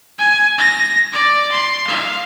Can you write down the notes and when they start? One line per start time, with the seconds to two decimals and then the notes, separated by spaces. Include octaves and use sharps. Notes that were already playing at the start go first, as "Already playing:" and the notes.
0.19 G#5
0.58 A#6
1.13 D5
1.52 C6
1.87 F5